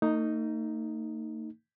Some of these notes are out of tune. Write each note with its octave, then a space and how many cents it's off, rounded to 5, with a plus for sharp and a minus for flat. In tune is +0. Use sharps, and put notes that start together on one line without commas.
A3 +45 D#4 +0